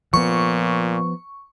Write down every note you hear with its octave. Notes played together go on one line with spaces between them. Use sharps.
A#2 F3 B3 C#6